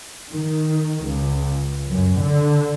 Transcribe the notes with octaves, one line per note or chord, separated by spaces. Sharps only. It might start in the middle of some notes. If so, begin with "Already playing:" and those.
D#3
C#2
F#2
D3